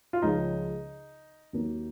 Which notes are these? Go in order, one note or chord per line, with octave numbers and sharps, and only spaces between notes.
F4
C#2 C#3 F3 D#4
D#2 D#3 F#3 A#3